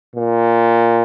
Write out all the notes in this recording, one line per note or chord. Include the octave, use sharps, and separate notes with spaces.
A#2